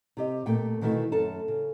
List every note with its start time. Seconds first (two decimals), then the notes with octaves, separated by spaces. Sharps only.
0.17 C3 G4 D#5
0.46 A#2 A3 G5
0.81 B2 D#3 E3 A3 F#4
1.12 F#2 A4 A5
1.48 C#3